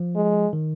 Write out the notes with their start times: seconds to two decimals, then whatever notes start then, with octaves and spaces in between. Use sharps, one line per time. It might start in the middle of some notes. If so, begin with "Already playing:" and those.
Already playing: F3
0.15 G#3
0.53 D#3